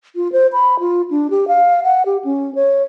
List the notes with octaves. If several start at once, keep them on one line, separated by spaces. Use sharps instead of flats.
F4
C5
B5
F4
D4
G4
F5
F#5
G4
C#4
C#5